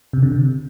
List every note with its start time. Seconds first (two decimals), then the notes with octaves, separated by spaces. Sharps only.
0.13 C3
0.23 D3
0.32 C3